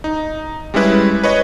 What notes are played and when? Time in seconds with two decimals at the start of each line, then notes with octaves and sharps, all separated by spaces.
0.04 D#4
0.74 G3 G#3 C#4 E4 B4
1.24 B4 C#5 D#5